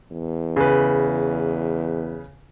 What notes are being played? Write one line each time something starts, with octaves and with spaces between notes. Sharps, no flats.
E2
C#3 B4